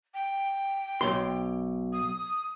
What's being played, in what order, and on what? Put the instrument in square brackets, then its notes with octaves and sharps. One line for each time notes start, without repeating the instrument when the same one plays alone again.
[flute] G5
[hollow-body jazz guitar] B1 C6
[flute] D#6